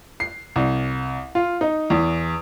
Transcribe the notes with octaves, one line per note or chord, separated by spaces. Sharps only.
C7
C2
F4
D#4
E2